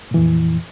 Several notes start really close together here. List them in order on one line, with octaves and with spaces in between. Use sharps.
A#2 E3 F2